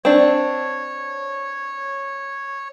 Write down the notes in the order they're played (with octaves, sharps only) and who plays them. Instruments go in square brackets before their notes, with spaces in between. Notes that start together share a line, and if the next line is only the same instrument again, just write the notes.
[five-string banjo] C4 D4 [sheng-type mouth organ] C#5